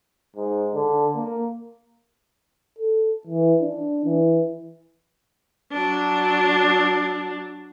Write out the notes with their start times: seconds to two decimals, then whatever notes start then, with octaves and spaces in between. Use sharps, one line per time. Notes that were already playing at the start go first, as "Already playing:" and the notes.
0.36 G#2
0.74 D3
1.16 A#3
2.79 A4
3.27 E3
3.61 D4
4.05 E3
5.72 F#3 D4